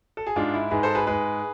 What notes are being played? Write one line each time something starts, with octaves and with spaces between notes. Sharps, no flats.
A4
G#4
G#2 G#3 D4 F4
E4
G#2 G#3 G#4 B4
A4 C5
G#4 B4
G#2 G#3 G#4 B4